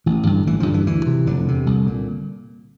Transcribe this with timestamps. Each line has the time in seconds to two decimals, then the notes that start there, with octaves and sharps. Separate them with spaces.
0.06 A1 E3
0.27 G2 D3
0.47 A1 E3
0.60 F3
0.66 G2 D3
0.74 E3
0.86 D2 E3
1.06 C3
1.26 F1 D3
1.46 E2 C3
1.66 C2
1.87 A#2